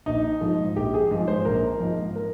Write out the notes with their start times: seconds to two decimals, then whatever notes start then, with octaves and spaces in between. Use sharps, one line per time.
0.06 A#1 D#4
0.41 G#2 F3
0.76 A#1 G4
0.94 G#4
1.11 G#2 F3
1.28 C5
1.45 A#1 A#4
1.80 G#2 F3
2.16 A#4